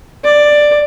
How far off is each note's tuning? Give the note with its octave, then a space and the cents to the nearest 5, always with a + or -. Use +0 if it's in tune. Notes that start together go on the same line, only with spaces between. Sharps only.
D5 +10